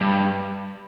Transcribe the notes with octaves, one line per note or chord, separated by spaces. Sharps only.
G2